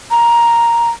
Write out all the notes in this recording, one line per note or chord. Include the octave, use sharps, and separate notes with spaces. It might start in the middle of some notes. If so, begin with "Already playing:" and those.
A#5